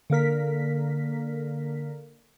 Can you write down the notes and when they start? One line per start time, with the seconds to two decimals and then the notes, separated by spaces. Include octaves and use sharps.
0.10 D3 A#3 A#4 B6